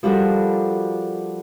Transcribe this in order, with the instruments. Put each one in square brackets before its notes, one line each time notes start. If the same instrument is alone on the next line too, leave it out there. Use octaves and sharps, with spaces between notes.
[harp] F3 G3 D4 F#4 A4 A#4